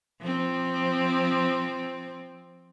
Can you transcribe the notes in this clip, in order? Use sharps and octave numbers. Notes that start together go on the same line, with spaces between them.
F3 C4